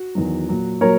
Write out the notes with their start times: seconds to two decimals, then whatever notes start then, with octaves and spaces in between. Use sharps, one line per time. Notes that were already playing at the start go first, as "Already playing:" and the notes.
Already playing: F#4
0.15 E2 D#3 F#3
0.49 A#2 F#3
0.81 A#2 F#3 A#4 C#5